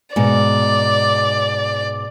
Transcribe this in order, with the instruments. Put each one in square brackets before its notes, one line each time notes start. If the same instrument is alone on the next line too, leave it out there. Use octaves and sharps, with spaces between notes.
[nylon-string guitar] G#2 B2 [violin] D5